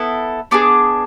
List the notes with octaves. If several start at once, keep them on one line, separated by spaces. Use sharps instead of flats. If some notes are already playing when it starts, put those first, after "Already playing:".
Already playing: B3 E4 A4
B3 D4 G#4 D6